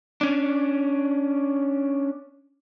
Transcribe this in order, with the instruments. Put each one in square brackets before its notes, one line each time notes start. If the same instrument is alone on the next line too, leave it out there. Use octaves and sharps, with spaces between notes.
[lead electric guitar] C#4 D4